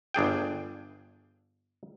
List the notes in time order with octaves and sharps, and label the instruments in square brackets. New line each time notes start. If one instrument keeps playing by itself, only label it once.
[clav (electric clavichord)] G1 D4 G#4 G5